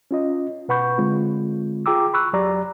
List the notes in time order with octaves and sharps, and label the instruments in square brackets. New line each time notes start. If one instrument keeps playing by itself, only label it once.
[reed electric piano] C#4 F4 D#5
B2 B4 F#5 B5 C#6 G6
D3 G#3 C4 F4
F4 G#4 G5 A#5 D6 E6
B5 C#6 E6 F#6
F2 F#3 G4 D5 A#5